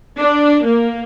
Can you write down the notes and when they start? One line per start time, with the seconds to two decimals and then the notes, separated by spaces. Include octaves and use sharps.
0.19 D4
0.65 A#3